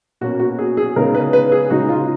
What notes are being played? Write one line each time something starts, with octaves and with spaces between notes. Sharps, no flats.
B2 A#3 C#4 F#4
F#4
G#4
G#4
C#3 G#3 B3 D#4 A#4
B4
B4
G#4
C#3 G#3 D#4 F#4
F4